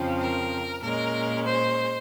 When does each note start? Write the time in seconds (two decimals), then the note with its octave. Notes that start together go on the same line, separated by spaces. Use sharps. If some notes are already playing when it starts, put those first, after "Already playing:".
Already playing: F2 C#3 F3 C4
0.19 A#4
0.82 A#2 G#3 C#4 A#4
1.45 C5